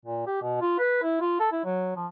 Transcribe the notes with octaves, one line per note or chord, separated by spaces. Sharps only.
A#2
G4
B2
F4
B4
E4
F4
A4
E4
F#3
F3